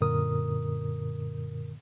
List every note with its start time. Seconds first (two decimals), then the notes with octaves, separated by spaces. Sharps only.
0.01 F#2 A#2 D3 A#4 D#6